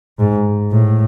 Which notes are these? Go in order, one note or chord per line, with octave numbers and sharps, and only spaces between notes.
G#2
A2